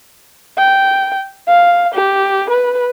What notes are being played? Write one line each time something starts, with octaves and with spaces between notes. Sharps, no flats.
G5
F5
G4
B4